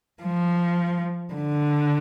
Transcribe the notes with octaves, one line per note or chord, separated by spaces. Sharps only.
F3
D3